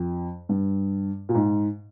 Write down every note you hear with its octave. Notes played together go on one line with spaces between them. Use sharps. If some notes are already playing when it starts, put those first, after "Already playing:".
Already playing: F2
G2
A#2
G#2